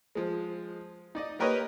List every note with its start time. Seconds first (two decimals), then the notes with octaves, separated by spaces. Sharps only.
0.15 F3 G#3
1.15 D#4 D5 D#5
1.39 A#3 G4 A#4 B4 C#5 D#5